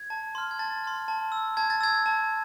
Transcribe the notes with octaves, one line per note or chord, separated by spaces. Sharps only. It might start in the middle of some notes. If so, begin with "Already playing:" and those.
Already playing: G#6
A5
C6 F6
G#6
A5 A6
C6 F6
A5
E6
A5 G#6
A6
E6 G#6
A5